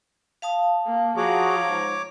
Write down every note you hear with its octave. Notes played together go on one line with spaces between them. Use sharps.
F5 A5 D#6
A#3
F3 F#4 G#4 C#5 A#5 D6
G#2